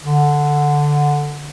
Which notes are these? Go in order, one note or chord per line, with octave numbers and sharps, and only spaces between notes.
D3